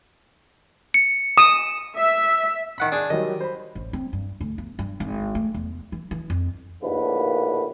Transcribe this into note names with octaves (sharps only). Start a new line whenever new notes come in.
C#7
D#6 E7
E5
D#3 F#5 B5
D4 G#4
D#3 F#3 G3 D#5
C5 B5
A1
C4
G2
D2
B3
G2
G#1
A3
E2
E3
E3
F2
A#1 D#2 A2 D3 B4